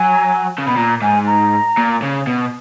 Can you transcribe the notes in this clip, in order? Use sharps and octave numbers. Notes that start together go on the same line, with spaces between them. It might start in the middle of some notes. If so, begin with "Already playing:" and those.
Already playing: F#3 G#5
C#3
B2 B5
A#2 A#5
G#2 G#5
A#5
A#2
C#3
B2